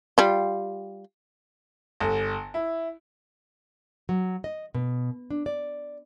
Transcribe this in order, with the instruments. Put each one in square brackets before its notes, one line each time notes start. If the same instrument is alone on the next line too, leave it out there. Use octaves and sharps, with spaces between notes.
[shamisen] G3 F4
[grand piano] G1
E4
[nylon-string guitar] F#3
D#5
B2
D4
D5